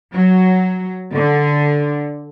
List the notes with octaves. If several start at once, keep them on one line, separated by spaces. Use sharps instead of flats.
F#3
D3